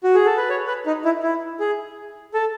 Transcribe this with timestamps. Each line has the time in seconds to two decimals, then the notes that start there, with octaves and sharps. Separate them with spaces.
0.04 F#4
0.14 G#4
0.26 A4
0.37 B4
0.50 C#5
0.67 B4
0.86 D#4
1.05 E4
1.23 E4
1.60 G#4
2.34 A4